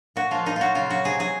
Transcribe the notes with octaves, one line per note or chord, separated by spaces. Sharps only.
A#2 F#4
F3 G#3 F4
A#2 D#4
F#3 F4 F#4
C#3 F4
F#3 F#4
C3 G#4
F#3 G#4